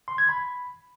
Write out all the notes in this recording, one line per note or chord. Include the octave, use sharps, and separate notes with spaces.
C6
G#6
B5